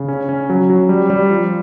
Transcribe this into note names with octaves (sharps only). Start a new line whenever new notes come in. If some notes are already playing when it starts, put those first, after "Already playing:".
Already playing: C#3
C#4
C#4
F#3
F#3
G3
G3
F3